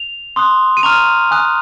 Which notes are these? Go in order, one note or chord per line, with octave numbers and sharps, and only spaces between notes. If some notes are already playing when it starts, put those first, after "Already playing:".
Already playing: F7
C6 D#6 F#6
D#7
A#5 C#6 F6 F7
G#5 D#6 F#6